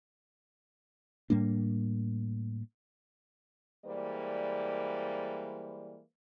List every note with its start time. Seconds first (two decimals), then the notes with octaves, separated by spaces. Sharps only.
1.30 A2 G3 A#3 D4
3.85 E3 G3 G#3 A#3 C5 D5